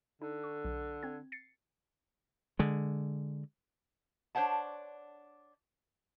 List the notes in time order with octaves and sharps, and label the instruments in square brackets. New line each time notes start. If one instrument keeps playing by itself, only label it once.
[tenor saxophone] D3 [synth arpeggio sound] D#4
[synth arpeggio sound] C#6
B1
C4 G#6
A6 C7 C#7
[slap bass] D3 G#3
[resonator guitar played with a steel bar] D4 C5 C#5 F#5 A5